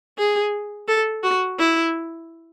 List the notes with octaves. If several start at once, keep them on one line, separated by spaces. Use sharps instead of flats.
G#4
A4
F#4
E4